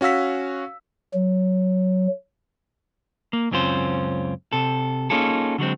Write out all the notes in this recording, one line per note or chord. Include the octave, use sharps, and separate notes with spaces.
C#4 F#4 F5 E6 B6
F#3
A#3
C#2 F#2 C4 C#4 F4 C5
C3 A4
A#3 C#4 D#4 F4 G#4 A4
D3 F#3 G#3 C4